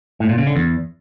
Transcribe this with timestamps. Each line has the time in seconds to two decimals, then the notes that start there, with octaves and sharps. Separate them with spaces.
0.20 A2
0.29 A#2
0.38 C#3
0.47 D3
0.56 E2